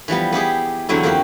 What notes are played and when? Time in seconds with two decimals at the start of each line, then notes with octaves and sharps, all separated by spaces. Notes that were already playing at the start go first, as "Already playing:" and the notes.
0.08 E3 F3 G3 B3
0.32 B3 E4 G4 G#4
0.89 E2 D3 F#3 C4 E4
1.03 F2 F3 A#3 F#4 G4